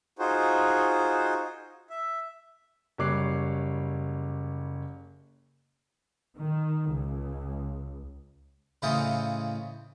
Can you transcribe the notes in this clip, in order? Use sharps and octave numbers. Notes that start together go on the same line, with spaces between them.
D#4 F4 F#4 G#4 C5
E5
F#1 G3 C#5 D6 F#6 C7
D#3
C#2
A2 C#3 E3 F4 C5 D#5